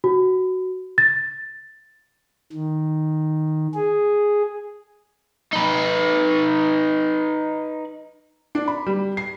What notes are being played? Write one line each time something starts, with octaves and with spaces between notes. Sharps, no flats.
F#4
A6
D#3
G#4
D#4 B4
D4
B5
G3
C7